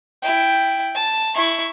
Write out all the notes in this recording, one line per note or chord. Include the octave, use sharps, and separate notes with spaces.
E4 G5
A5
E4 C#6